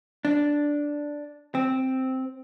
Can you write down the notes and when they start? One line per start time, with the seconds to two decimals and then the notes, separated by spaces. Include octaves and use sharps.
0.25 D4
1.55 C4